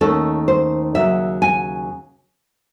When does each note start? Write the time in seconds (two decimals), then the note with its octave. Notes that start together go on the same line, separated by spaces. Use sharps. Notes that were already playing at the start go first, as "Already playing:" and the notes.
0.01 D#2 D#3 A3 C#4 A4
0.48 C5
0.95 D#2 C#3 F#3 E5
1.42 G#5